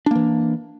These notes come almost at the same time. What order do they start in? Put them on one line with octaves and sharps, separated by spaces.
D4 A#3 E3